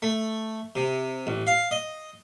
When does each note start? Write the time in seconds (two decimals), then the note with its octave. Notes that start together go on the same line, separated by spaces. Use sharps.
0.02 A3
0.76 C3
1.27 A1
1.47 F5
1.71 D#5